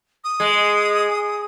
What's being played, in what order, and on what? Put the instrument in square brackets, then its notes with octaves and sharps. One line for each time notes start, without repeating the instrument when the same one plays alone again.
[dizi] D#6
[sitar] G#3